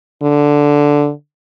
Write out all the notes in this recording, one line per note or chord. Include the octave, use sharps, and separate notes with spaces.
D3